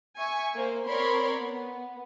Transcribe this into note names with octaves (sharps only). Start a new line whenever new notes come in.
E5 G#5 C#6
A#3 C5
C4 A#4 C#5 D5 B5 C6
B3